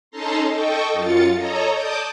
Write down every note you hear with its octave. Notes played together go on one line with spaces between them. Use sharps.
C#4 D#4 A4 A5 A#5 C6
A4 D#5 G5 C#6
F#2 F4 A6 C#7
A4 C#5 D#5 A#5
D5 A5 D6 D#6 G6